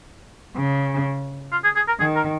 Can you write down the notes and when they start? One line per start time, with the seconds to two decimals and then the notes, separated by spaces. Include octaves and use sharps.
0.57 C#3
1.52 F4
1.64 G#4
1.76 G#4
1.88 A#4
2.00 D#3 G#4
2.16 A#4